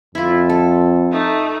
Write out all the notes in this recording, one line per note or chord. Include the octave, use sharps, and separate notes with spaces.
F2 E4 F4
A4
A3 D#4